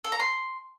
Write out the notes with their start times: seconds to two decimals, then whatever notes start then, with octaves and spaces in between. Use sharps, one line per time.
0.04 A4
0.12 A#5
0.20 C6